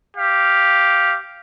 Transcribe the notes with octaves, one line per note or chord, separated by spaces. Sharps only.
G4 F5